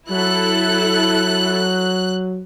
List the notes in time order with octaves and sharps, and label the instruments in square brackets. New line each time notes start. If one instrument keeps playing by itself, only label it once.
[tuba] F#3 [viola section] E4 A4 [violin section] F#6